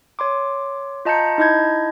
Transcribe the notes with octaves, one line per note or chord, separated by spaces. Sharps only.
C#5 C6 D6
F4 D#5 A5 A#5 G6 C#7
D#4 E4 D#5 A5 G6 G#6